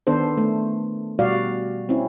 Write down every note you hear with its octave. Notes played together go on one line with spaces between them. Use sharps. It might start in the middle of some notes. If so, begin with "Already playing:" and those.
D#3 B3 D4 A4 C5
A3
B2 G3 F#4 D5 F5
C4 C#4 E4